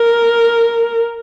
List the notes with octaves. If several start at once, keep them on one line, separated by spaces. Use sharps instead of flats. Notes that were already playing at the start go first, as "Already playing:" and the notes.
Already playing: A#4